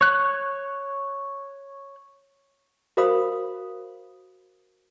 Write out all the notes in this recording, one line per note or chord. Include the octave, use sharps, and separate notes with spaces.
C#5 F#6
F#4 A#4 C5 F5 B5 D#6